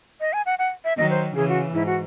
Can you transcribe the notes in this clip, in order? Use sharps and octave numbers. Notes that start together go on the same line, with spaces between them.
D#5
G#5
F#5
F#5
E5
D#3 F#3 D#5
C5
C#3 E3 G#4
F#4
G#2 E4
F#4